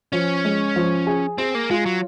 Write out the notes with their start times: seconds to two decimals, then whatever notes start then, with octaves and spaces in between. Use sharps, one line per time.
0.12 F3 C#4
0.45 G#3
0.76 F3
1.07 G#4
1.38 C4 G#4
1.55 A#3
1.70 G#3 F4
1.86 F#3